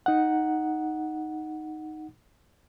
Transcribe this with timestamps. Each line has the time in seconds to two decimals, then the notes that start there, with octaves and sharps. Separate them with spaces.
0.06 D#4 F#5